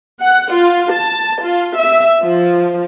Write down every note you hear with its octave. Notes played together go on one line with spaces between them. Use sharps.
F#5
F4
A5
F4
E5
F3